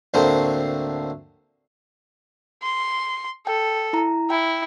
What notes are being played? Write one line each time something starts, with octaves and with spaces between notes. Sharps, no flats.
D2 A2 D3 A#3 C4 C5
C6
A4 G5
E4 A#5
E4 G5